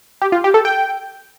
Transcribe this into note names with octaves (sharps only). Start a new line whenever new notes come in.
G4
F4
G4
A4
G5